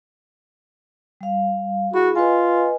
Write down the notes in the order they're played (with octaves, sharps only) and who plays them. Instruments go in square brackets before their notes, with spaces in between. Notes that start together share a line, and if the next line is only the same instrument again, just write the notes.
[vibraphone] G3 F5
[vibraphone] E4 G#4 B5 [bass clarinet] F#4
[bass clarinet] F4 [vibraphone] B4 D#5 G#5